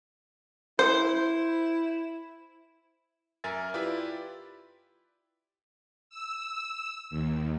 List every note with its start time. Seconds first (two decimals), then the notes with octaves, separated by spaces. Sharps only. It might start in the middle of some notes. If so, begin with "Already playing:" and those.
0.79 E4 C5
3.44 F#2 A#4 E5 G#5 A6
3.74 E4 F4 G4 B4 D5 E5
6.10 E6
7.10 D#2